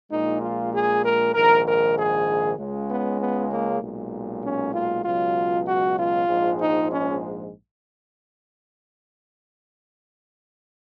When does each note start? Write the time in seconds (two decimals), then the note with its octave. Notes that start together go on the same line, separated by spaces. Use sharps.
0.10 A#1 A#2 G#3 D#4
0.41 F4
0.72 G#4
1.03 A#4
1.33 A#1 G#2 D#3 A#4
1.65 A#4
1.96 G#4
2.57 C#2 C#3 G#3
2.88 B3
3.19 B3
3.50 A#3
3.81 B1 A#2 G#3
4.42 C#4
4.73 F4
5.04 C#2 B2 F#3 F4
5.66 F#4
5.96 F4
6.28 A#1 G#2 F3 G#3
6.58 D#4
6.89 C#4